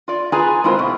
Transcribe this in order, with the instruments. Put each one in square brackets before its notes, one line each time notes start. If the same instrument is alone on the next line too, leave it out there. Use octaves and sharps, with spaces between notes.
[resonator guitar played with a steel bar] F4 D5
F4 G#4 B4 D5 G#5 A#5
G#3 C4 E4 F4 A#4 C5
B2 A3